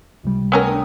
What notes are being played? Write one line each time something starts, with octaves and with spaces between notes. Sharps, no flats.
C#2 C3 G3
A3 B3 C#4 A#4 G5 A#5
D4 D#6